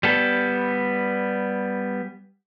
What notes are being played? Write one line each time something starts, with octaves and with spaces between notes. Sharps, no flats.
G3 B3 A4